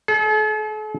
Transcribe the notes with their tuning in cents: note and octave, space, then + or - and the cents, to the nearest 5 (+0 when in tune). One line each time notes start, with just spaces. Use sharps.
A4 -45